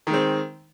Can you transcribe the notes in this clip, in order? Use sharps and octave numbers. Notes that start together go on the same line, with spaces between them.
D#3 G#3 C4